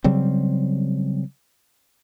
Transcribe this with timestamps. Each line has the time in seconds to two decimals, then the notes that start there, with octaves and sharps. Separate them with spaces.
0.04 C#3 F#3 G3 C4